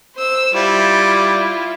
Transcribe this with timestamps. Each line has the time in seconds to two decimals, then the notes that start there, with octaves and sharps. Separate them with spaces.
0.15 C5 E6
0.54 G3 E4 F4